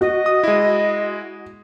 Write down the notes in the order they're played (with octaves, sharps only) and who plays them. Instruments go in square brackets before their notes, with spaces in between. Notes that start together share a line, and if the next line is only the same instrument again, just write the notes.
[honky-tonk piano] F#4 [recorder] D#5
[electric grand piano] D#6
G#3 E4